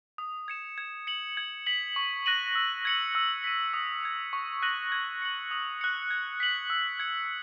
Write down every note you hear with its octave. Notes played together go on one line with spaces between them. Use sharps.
D#6
G#6 C#7 E7
G#6
C#7 F#7
G#6
B6 F#7
C#6
F#6 A#6 D#7 F#7
E6
G#6 C#7 F#7
E6
B6 D#7
D#6
G#6 C#7
C#6
F#6 A#6 D#7 F#7
G#6
C#7 F#7
D#6
F#6 C#7
G#6
B6 F#7
E6
G#6 C#7